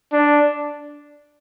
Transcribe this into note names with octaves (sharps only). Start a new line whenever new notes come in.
D4